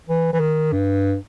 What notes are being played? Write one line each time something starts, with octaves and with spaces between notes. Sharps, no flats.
E3
E3
D#3
G2